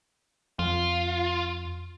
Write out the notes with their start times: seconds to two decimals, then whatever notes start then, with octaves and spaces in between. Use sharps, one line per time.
0.59 F2 F4